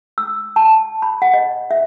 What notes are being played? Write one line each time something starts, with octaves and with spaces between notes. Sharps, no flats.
E6
A5
B5
F#5
D#5
E5